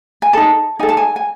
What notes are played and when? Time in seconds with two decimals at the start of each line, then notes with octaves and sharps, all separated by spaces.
0.22 G#5
0.33 D#4 A4 A5
0.79 D#4 A4 G#5
0.89 A5
0.97 G#5
1.16 G#5